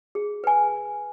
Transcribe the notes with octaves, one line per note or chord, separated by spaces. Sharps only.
G#4
B4 G#5